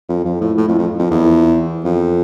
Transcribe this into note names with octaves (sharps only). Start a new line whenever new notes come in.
F2
F2
A2
A2
F2
F2
F2
E2
F2